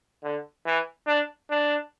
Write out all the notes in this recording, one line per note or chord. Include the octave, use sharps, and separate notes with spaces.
D3
E3
D4
D4